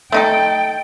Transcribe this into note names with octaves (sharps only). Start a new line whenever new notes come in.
A3 D#4 A4 G5